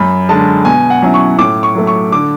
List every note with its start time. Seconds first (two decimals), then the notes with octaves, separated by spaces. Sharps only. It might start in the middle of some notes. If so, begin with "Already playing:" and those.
Already playing: F#2 B5
0.29 D3 G#3 A5
0.65 B2 G#5
0.90 F#5
1.02 F#3 C#4 E4
1.14 C#6
1.38 A2 D6
1.63 C#6
1.75 F#3 A3
1.87 C#6
2.12 D3 D6